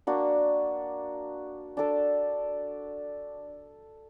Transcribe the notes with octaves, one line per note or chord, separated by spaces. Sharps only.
A#3 D4 F#4
D4 A4 D5